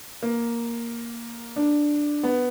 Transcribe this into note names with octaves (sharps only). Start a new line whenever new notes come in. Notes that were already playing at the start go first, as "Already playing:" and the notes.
A#3
D4
B3